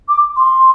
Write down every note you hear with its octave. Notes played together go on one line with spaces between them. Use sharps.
D6
C6